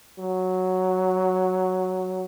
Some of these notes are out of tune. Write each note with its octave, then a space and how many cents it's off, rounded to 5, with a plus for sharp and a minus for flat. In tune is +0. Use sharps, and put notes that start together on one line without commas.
F#3 +0